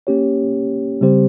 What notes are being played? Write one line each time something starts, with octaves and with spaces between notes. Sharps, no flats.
A#3 C#4 G4 C#5
C#3 G3 C4 G4 C5